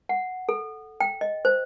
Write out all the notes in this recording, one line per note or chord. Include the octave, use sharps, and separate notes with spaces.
F#5
A4
G5
D#5
C5